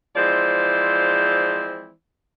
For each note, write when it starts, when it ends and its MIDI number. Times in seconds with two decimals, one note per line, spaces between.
0.16 1.90 52
0.16 1.90 53
0.16 1.90 56
0.16 1.90 60
0.16 1.90 72
0.16 1.90 74